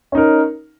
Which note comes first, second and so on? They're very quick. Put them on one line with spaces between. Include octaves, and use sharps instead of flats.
C#4 D#4 A#4